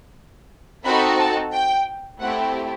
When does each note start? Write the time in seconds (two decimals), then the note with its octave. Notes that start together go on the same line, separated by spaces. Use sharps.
0.85 C4 D#4 F#4 A4 B5
1.19 A5
1.53 G5
2.21 A3 C4 E4 G4 F#5